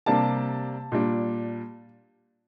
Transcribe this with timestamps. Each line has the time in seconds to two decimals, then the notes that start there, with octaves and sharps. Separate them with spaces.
0.06 C3 G3 A#3 D4 A5
0.92 A#2 G3 D4